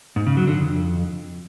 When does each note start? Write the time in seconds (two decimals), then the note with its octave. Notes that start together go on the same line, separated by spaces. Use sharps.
0.16 G#2
0.27 C#3
0.37 F#3
0.47 D3
0.58 F2